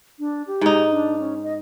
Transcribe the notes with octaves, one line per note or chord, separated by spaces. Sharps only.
D4
G4
G#2 D#4
D4
C#4
D#5